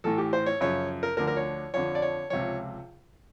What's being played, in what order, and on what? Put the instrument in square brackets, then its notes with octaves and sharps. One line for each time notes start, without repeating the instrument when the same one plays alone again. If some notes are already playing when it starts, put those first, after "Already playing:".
[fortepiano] A1 A2 E3 A4
G4
C5
C#5
F#2 C#3 F3 C#5
A#4
D2 D3 F3 A#4
A#4
C#5
F2 D3 F3 C#5
D5
C#5
C#2 C3 F3 C#5